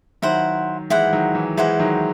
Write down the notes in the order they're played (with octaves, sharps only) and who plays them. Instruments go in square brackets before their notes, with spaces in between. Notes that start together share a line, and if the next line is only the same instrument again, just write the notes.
[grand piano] D#3 F#3 [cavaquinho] E4 C5 F#5
[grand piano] E3 G#3 [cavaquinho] E4 C5 F#5
[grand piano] D#3 F#3
E3
[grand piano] E3 G#3 [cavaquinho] E4 C5 F#5
[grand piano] D#3 F#3